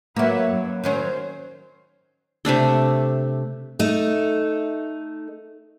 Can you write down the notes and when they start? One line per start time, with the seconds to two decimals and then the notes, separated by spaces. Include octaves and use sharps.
0.16 F#3 A#3 F#4 B4 E5
0.50 F#2
0.84 D#3 F#3 C#4 C5
2.45 C3 A3 D4 A4
3.79 A3 D#4